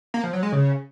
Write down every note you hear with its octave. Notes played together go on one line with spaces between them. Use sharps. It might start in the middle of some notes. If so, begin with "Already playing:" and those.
A#3
F3
F#3
G#3
C#3